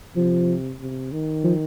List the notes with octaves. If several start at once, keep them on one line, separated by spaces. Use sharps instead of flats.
C3 F3
C3
D#3
F3